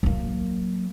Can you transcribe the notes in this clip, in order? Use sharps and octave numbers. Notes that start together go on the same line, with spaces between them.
F#3 A#3